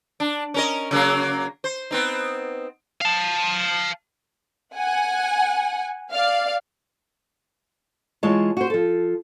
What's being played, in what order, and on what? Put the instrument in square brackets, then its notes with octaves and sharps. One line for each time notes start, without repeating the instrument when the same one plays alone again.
[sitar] D4
C#4 A#4 D#5
C#3 F#3 A#3
C5
B3 C4 D#4
[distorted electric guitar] F5 A5
[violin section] F#5 G#5
D5 F5
[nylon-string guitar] E3 G#3 F4 C#5 D#5 A5
F#4 C5
F3 A4